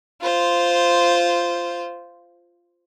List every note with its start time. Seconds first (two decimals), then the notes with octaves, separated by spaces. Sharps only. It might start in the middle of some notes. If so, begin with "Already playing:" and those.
0.21 F4 C5